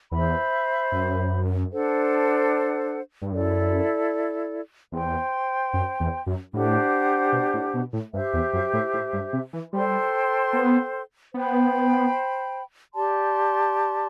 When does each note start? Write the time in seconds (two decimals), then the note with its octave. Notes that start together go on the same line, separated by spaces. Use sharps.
0.11 E2 C5 E5 B5
0.92 F#2
1.72 D4 A4 C5 F#5
3.22 G2
3.32 F#2 E4 A4 D5
4.92 E2 C5 G5 C6
5.73 F#2
6.00 E2
6.27 F#2
6.53 A2 D4 G4 C5 F#5
7.32 B2
7.54 A2
7.74 B2
7.93 A2
8.13 G2 G4 C5 E5
8.33 E2
8.53 F#2
8.73 A2
8.94 A2
9.13 G2
9.33 C3
9.53 E3
9.73 G3 A4 C5 G5 C6
10.53 B3
11.34 B3 C5 G5 B5
12.93 G4 D5 A5 C6